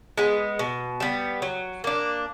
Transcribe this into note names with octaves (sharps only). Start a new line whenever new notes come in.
G#3 B3
B2
G3 B3
F#3
A#3 D4